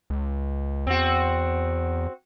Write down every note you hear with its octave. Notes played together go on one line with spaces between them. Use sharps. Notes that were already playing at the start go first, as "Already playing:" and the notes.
C#2
E2 C4 F#4